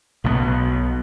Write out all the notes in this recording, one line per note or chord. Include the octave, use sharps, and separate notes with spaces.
B1 B2 F3 B3